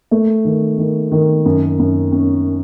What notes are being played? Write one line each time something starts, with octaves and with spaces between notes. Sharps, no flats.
A3
D#3
D#3
D#3
F#2
F#2
C#4